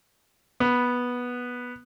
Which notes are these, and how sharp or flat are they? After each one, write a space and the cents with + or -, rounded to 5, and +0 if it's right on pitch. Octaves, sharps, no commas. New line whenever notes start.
B3 -10